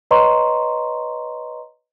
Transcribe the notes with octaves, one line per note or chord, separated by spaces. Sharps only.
B4 C#5 D#5 A#5 C6 C#6